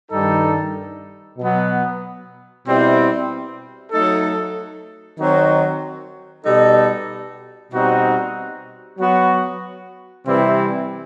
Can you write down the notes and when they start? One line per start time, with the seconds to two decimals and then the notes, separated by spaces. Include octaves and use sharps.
0.11 G2 D#3 G3 D#4 A4
1.38 B2 F#3 B3
2.65 B2 G3 C4 E4
3.92 F#3 A3 D#4 A4
5.19 D#3 F#3 C4 D#4 F#4
6.45 B2 G3 D#4 A4
7.72 B2 G3 C4 D#4 F#4
8.99 F#3 B3 F#4
10.26 C3 E3 G3 C4 E4